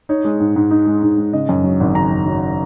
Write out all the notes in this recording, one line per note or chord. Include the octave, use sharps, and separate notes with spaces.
D#4 C#5
G#3
G#2
G#2
D#4
G#3
G#2
G#2
C#3 D#5
F#2
F#3
G#1
C#3 A#5
F#2
F#3